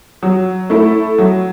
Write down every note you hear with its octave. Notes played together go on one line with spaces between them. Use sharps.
F#3
A3 E4
F#3